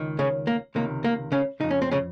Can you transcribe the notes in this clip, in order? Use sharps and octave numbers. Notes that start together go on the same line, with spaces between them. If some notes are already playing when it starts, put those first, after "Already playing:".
Already playing: C#2 D#3
C#3 C#4
A#3
C#2 C3 D#3 A#3
A#3
C#3 C#4
F2 C#3 D#4
C#4
C4
C#3 C#4